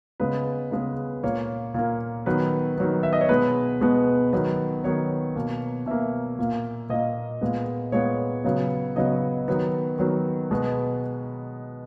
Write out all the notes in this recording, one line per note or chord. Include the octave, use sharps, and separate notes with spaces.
C#3 G#3 B3 B4
C#3 G#3 B3
A#2 A#3 C#5
A#2 A#3
D#3 F#3 B3 B4
D#3 F#3 B3
E5
D#5
C#5
B2 G#3 B3 B4
B2 G#3 B3
D#3 F#3 B3
D#3 F#3 B3 C#5
B2 A#3
B2 A#3 E5
A#2 A#3
A#2 A#3 D#5
A#2 G#3 B3
A#2 G#3 B3 C#5
C#3 F#3 B3
C#3 F#3 B3 D#5
D#3 F#3 B3
D#3 F#3 B3
B2 G#3 B3